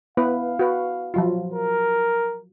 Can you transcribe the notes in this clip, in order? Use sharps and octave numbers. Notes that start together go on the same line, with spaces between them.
B3 E4 B4 F5
F#4 B4
F3 F#3 F4
A#4